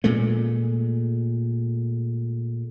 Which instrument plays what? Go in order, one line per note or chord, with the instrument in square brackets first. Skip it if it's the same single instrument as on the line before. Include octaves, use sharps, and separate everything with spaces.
[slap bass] A#2 G#3 A3